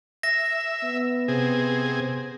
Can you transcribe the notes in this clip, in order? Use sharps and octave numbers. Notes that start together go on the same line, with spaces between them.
E5 A#6
B3
C3 G#4